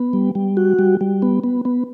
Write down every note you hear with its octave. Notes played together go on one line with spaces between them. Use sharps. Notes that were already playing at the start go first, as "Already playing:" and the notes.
Already playing: B3
G3
G3
F#4
G3
G3
B3
B3
B3